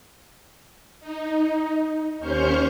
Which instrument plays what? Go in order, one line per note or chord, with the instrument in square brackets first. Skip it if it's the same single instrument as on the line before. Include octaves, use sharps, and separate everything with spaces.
[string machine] D#4
D#2 C#4 C5 C#6 F6 G6